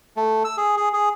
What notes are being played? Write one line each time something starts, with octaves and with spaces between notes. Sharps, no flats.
A3
E6
G#4
G#4
G#4